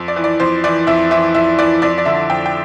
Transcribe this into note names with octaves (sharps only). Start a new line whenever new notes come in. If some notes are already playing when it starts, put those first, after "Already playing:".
Already playing: F2
D5
E3
D5
F2 C5
E3 D5
F2 E5
E3 E5
F2 E5
E3 D5
F2 D5
D5
D3 E5
F2 G5
G5